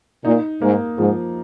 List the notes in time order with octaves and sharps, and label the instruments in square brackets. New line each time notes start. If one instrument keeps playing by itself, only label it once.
[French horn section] A#2 [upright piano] D#4
[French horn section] G#2 [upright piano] A#3
[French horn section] G#2 [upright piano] F3